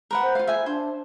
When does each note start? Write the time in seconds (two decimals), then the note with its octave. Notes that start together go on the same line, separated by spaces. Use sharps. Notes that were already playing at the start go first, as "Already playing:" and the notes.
0.11 A#4 B4 F#5
0.23 C5
0.35 F4 F5
0.47 E5 G#5
0.66 D4 C5